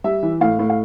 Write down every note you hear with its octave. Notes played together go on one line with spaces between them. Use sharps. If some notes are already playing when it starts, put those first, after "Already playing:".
G3 E5
E3
A2 F5
A2
F5